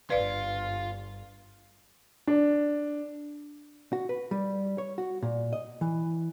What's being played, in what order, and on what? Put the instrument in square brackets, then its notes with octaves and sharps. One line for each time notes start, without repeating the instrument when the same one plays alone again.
[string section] G1 [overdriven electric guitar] F4 [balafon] B4 D5 F5
[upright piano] D4
[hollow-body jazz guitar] F#4
B4
G3
C#5
F#4
A#2
D#5
E3